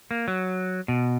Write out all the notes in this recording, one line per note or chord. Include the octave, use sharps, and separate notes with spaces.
A#3
F#3
B2